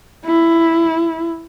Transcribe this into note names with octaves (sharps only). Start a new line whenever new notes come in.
E4